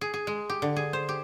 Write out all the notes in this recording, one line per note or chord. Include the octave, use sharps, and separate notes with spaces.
G#4
G#4
G#3
G4
D3
G#4
C5
G4